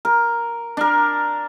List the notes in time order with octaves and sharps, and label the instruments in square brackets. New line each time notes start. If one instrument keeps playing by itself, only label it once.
[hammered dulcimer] A#4
D4 A#4